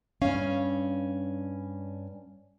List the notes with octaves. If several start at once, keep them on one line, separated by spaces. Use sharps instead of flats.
G2 C#4 F5